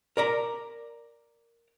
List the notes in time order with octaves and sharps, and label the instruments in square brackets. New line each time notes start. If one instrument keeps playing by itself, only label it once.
[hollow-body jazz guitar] A#4 D5 A#5